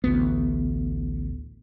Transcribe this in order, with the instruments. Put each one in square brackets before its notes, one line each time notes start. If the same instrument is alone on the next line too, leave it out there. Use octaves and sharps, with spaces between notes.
[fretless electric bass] A1 D2 B3